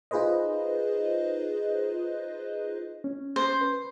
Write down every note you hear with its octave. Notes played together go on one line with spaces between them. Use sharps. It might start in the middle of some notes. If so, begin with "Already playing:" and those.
D#4 F4 G#4 B4 C5 D#5
C#4
C5
B4